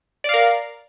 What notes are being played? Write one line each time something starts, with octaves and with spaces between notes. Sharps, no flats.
A#4 D5 F5